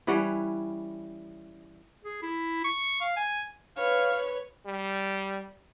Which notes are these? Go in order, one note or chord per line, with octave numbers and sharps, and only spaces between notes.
E3 G3 C#4 F#5
G#4
E4
C#6
F5
G#5
B4 C#5 F5
G3